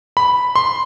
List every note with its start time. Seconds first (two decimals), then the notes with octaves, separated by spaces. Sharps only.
0.17 B5
0.56 C6